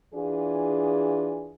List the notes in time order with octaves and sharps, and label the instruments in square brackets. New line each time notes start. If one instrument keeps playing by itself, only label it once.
[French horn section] E3 D4 F4 G#4